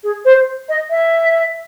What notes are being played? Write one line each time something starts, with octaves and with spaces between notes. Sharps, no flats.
G#4
C5
D#5
E5